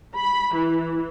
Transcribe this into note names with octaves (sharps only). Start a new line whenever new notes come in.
B5
E3